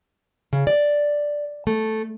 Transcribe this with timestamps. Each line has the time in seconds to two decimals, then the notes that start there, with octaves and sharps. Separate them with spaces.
0.53 C#3
0.67 D5
1.67 A3